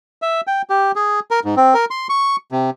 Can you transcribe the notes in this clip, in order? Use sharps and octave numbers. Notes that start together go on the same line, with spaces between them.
E5
G5
G4
G#4
A#4
G#2
C4
A#4
C6
C#6
C3